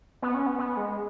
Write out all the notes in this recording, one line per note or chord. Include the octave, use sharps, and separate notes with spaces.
B3
C#4
B3
B3
G#3